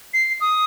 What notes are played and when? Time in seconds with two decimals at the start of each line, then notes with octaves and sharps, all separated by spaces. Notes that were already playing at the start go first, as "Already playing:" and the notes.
0.14 C7
0.41 D#6